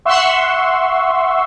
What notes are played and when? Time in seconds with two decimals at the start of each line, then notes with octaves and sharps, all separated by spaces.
0.05 E5 F#5 C6 C#6 E6